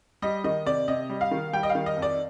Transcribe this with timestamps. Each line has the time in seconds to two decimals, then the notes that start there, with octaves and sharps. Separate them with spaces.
0.22 G3 D#5
0.44 D#3 D#5
0.66 C3 D5
0.88 C3 D#5
1.10 G3
1.21 F5
1.31 D#3
1.53 G3 G5
1.63 D#5
1.70 F5
1.75 D#3
1.86 D#5
1.97 F2
2.02 D5